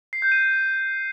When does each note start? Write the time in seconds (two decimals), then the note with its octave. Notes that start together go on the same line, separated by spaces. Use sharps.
0.13 C7
0.22 G6
0.32 D#7